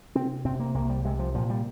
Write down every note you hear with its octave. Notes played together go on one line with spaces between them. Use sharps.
C3 C4
C3 C4
A#3
C2 A#3
G3
C3 G#3
F3
A#2 F3
G3